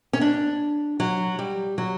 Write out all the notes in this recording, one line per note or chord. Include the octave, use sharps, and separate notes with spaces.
C#4
D4
F#3
G3
F#3